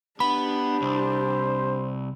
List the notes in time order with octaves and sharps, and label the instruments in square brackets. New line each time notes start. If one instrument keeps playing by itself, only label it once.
[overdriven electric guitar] B3 [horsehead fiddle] D4 G4 [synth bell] B5
[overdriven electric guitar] C2 [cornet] C5